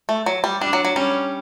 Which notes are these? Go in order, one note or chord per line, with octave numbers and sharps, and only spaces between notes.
A3
F#3
G3
G3 D4
F#3
F#3
G3 C#4